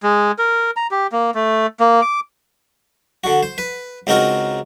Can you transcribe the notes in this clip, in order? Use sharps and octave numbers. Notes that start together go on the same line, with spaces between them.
G#3
A#4
A#5
G4
A#3
A3
A#3
D6
D3 F#4
C5
B4
C#2 C4 D#4 F#4 A#4